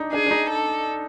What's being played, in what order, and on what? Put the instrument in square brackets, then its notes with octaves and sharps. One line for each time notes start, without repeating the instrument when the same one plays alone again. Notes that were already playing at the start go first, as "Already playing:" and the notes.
Already playing: [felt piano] D4 D#4
[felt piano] D4 [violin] G#4
[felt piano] D4
D#4
[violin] A4